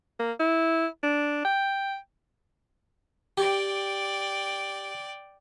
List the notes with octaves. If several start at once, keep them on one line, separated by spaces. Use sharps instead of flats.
A#3
E4
D4
G5
G4 D5 G5